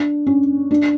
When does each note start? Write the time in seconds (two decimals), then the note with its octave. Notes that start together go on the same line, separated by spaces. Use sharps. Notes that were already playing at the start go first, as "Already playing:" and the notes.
Already playing: D4
0.27 C#4
0.71 D4